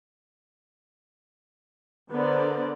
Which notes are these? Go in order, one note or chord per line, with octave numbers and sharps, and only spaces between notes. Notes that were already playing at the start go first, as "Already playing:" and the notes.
D3 B3 A#4 C5 D5